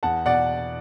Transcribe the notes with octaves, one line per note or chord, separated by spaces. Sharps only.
E2 F#5 A5
B2 D5 F#5